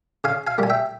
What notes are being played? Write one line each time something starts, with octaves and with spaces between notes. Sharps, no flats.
C#3 F5 G#5
F5 G#5
G3 A#3 G#5
E5 G5